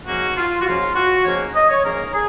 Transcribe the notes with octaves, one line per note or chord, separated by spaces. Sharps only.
G#2 F3 A#3 C#4 F#4
F4
F#4
G#2 F3 A#3 C#4 F4
F#4
G#2 F3 A#3 C#4 C#5
D#5
C#5
G#2 F3 A#3 C#4 A#4
G#4